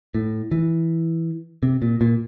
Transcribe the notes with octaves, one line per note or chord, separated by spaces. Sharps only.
A2
E3
C3
A#2
A#2